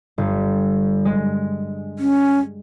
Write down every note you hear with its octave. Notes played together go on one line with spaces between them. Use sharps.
G1
G#3
C#4